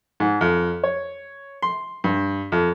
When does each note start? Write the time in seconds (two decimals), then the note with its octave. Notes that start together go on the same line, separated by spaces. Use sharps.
0.20 G#2
0.41 F2
0.84 C#5
1.62 C6
2.04 G2
2.52 F2